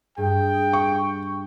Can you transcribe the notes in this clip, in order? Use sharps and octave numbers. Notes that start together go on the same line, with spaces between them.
G2 G#4 G5
C#6